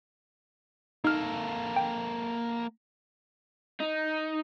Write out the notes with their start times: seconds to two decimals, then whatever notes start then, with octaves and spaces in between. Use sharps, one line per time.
1.04 A#3 D#4 A4 F6
1.76 G5
3.80 D#4